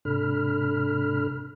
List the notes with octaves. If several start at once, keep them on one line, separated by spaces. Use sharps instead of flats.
G#2 C3 D4 A4 B5 F6